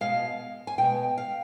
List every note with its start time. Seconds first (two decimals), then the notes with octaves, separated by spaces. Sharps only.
0.01 B2 G#3 F5
0.67 G#5
0.78 B2 G#3 G5
1.18 F5